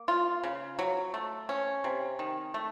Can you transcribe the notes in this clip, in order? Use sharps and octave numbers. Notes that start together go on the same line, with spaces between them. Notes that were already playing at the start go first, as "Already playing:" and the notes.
Already playing: A#3
F4
C#3
F#3
A3
C#4
C3
D#3
A3